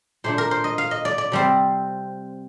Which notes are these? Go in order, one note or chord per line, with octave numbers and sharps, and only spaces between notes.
A#2 A3 D4 C5
A#4
C5
D#5
F5
D#5
D5
D5
C3 G3 C4